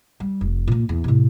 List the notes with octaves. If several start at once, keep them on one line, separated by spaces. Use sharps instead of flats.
G3
F1
A#2 A#3
E2
A2 C3